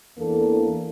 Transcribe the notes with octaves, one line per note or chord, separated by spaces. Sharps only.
E2 E3 A#3 D4 A4